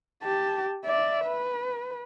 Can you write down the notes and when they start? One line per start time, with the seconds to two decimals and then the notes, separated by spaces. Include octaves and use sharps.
0.23 G4 A5
0.85 D5 E5
1.25 B4